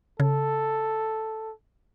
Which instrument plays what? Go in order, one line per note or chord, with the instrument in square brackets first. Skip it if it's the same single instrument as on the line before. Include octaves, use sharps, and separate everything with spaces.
[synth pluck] C#3 [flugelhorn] A4